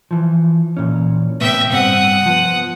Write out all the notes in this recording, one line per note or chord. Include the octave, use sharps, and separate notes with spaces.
E3 F3
A#2 E3 C#4
A2 C3 B3 E5 G5
G2 C3 C4 F#5 D#6
F3 B3